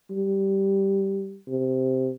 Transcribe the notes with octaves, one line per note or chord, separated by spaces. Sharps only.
G3
C3